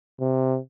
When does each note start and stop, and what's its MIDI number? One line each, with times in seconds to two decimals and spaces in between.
0.20 0.58 48